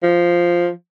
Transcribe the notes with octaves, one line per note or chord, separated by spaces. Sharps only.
F3